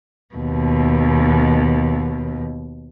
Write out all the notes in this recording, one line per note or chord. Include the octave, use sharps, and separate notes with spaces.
D#2 B2